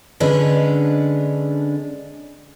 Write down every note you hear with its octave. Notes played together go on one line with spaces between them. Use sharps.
D3 G#3 C#4 D4 B4